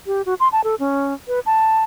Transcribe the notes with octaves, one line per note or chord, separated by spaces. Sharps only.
G4
F#4
C6
A5
A4
C#4
B4
A5